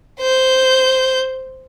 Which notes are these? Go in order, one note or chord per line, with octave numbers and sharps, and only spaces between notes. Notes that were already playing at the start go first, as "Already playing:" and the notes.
C5 G6